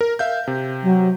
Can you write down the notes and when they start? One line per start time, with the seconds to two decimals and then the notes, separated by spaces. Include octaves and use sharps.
0.01 A#4
0.19 E5 F5 G6
0.47 C3
0.83 F#3